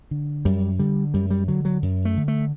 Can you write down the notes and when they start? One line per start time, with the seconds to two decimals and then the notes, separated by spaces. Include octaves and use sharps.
0.11 D3
0.45 F#2 G3
0.79 D3 G3
1.14 F#2 G3
1.31 G3
1.48 D3 F#3
1.65 F#3
1.82 F#2
2.05 A3
2.17 D3
2.28 A3